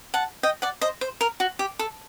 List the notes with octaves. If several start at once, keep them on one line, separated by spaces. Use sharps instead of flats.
F#5 A5
D#5 G5
D5 F#5
C5 D#5
C5
A#4
F#4
G4
A4